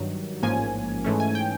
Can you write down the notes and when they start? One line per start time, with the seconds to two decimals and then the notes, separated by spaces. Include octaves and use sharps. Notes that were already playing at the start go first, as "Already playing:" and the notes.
Already playing: G2 D#3 F#3
0.43 A1 G#2 F3 A#3 C#4 G#5
1.04 G#2 E3 A3 C#4
1.20 G#5
1.35 G5